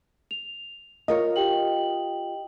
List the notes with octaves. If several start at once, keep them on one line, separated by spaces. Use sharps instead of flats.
F7
F4 A#4 C#5 D#5 F5
G4 G5 F#7